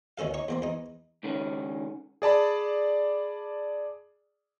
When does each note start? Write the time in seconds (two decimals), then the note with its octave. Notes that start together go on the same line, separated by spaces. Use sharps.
0.18 D2 D#3 C#4 A4 F5
0.34 D#4 C#5 C#6
0.48 E2 A#3 C4
0.62 E2 D#4
1.23 C#2 D#3 C#4
2.22 G#4 D5 A5 B5